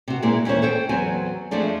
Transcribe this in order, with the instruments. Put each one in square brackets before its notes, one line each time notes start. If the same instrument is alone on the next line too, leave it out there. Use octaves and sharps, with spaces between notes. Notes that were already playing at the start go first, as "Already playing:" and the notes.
[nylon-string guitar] C3 F#4
A#2 G#3 A#3 C4 E4
D#2 E3 C#4 C5 C#5
A4 C5 G5
E2 F#3 C4 G#5
F2 F3 G#3 A3 D4